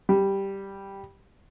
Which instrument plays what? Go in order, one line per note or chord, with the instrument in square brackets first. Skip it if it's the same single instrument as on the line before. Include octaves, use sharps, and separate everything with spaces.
[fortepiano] G3